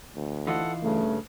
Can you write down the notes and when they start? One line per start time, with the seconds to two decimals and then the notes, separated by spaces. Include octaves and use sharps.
0.15 D2
0.47 E3 D#4 F4 A4 F#5
0.83 G2 C#3 A3